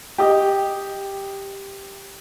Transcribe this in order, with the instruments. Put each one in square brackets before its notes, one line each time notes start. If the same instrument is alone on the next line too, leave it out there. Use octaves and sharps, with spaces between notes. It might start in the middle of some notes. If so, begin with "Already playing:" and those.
[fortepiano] G4 D#5